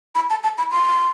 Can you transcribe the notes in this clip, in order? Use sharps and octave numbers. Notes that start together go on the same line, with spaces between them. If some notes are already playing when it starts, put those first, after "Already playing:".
B5
A5
A5
B5
C6